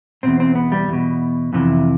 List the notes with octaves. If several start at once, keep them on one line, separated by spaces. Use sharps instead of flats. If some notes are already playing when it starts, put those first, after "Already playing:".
E2 B2 C4
C4
B3
G3
E2 B2
F2 C3 E3